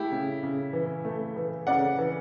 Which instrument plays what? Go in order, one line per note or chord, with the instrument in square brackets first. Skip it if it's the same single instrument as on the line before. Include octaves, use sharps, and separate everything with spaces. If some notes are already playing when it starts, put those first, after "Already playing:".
Already playing: [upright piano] A3 E4 G4
C#3
C#3
E3
A3
E3
C#3 D5 F#5
E3